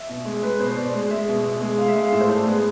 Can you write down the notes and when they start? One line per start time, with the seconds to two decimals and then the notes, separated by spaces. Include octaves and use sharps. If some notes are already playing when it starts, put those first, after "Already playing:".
Already playing: E5
0.09 B2
0.25 G#3
0.43 G#3 B4
0.59 B2 C5
0.76 B2 D5
0.94 G#3
1.10 G#3 E5
1.28 B2
1.45 B2
1.61 G#3
1.77 G#3 F5
1.88 E5
1.95 G#3 F5
2.12 A2 E5
2.21 C5
2.29 A2 A4
2.37 D4
2.45 G#3 B3